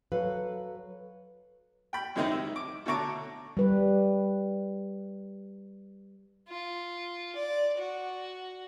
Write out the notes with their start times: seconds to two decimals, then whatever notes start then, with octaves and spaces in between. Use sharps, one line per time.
0.12 F#3 A4 B4 F5
1.93 G5 B5
2.16 F#2 C3 D#3 G#3 C4 D#4
2.31 E5
2.56 D6
2.86 B2 D3 A3 C#5 A#5 D6
3.57 G3 B4
6.49 F4
7.35 D5
7.78 F#4